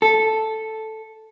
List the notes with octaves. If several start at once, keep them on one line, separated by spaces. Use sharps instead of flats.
A4